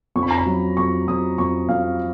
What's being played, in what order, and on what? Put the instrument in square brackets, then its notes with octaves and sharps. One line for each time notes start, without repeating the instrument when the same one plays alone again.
[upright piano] F2 C#6
B5
A#5
B5
F#3
F2 C#6
F2 D#6
F2 C#6
F2 F5